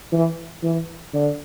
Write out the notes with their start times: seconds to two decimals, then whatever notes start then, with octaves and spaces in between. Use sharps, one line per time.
0.12 E3
0.63 E3
1.14 D3